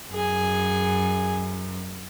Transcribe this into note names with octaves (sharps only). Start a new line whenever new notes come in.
F#2 G#4 G#5